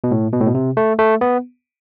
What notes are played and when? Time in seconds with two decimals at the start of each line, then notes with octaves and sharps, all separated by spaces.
0.04 B2
0.11 A2
0.33 B2
0.40 A2
0.46 B2
0.55 C3
0.77 A3
0.99 A3
1.21 B3